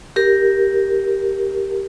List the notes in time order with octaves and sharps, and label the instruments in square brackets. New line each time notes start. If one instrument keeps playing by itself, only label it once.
[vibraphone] G4 A#4